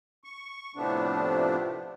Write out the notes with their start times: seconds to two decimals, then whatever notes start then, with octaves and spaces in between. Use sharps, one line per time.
0.24 C#6
0.76 A2 C3 F3 A3 B3 D4